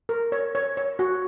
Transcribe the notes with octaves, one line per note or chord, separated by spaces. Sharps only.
A#4
C#5
C#5
C#5
F#4